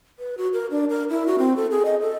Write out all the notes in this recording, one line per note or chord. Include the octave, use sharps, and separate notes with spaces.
B4
F#4
A#4
D4
A#4
E4
F#4
C4
A4
G#4
D#5
A4